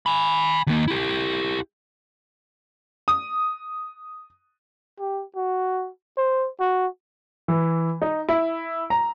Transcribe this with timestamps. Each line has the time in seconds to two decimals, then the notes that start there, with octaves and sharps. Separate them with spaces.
0.06 G#5 B5
0.67 D#2 A#3
0.88 E4 G4
3.08 D#6
4.99 G4
5.36 F#4
6.17 C5
6.60 F#4
7.48 E3
8.02 D#4
8.29 E4
8.90 A#5